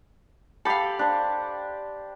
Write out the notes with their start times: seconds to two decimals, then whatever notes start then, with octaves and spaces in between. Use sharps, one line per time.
0.65 G4 A4 F5 B5
0.99 D4 C5